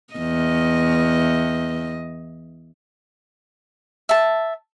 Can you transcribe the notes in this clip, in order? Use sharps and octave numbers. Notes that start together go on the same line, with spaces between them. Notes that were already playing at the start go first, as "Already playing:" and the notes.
E2 D#5
E5 A5